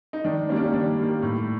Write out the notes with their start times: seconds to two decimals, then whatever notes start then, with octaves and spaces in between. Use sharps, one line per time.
0.13 D#4
0.24 D#3 D4
0.49 G3 A#3 C#4
0.56 D4
0.64 C#4
0.73 D#3 D4
0.99 G3 A#3
1.22 A2